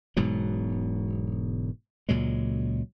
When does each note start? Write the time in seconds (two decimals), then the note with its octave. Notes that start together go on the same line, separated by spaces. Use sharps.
0.17 E1 G#2 B2 F#3
2.09 C#2 A#2 F#3 G#3